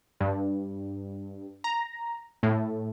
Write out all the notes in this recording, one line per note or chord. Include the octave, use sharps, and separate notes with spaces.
G2
A#5
A2